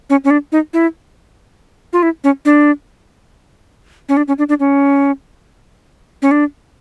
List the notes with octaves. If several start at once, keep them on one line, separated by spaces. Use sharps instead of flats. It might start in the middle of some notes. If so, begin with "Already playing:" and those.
C#4
C#4
D4
D#4
E4
F4
E4
C#4
D4
C#4
D4
C#4
D4
D4
C#4
C#4
D4